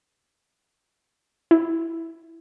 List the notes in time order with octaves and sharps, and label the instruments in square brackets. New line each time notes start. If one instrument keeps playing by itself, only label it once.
[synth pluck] E4